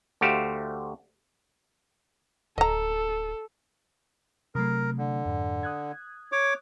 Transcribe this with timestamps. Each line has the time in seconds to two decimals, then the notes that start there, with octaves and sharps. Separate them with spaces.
0.21 D2 A3 F#4 G4 C5 F5
2.58 D1 A4 D#5 A#5
4.55 C3 F#3 A3 A#4
4.98 D3
5.25 F2 G#2
5.63 D#6 F#6 G#6
6.32 C#5 D6